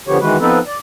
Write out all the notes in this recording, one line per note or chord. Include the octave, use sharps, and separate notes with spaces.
D3 F3 B3 G4 C#5
D#3 E3 G#3 F#4 B4
F3 B3 C4 D#4 A4 B4
D5